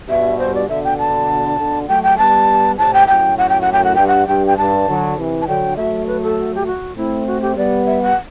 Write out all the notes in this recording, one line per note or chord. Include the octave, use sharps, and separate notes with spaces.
G2 B2 E5
C5
D5
B2 D3 E5
G5
A5
B2 D3
F#3 A3 G5
G5
G3 B3 A5
A2 C3 A5
G5
F#2 A2 G5
F#5
G5
F#5
G5
F#5
G2 G5
F#5
G2 G5
G5
G2 A5
D3 F#3
C3 E3
A5
D3 F#3 G5
F#3 A3 E5
B4
A4
G4
F#4
A3 C4 E4
F#4
G4
G3 B3 D5
E5
F#5